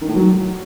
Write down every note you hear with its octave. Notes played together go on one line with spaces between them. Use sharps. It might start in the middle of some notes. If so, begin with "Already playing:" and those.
D#3
A2
F#3